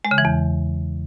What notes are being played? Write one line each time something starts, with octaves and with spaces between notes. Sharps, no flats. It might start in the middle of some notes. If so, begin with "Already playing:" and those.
G#3
C#3
E3
E2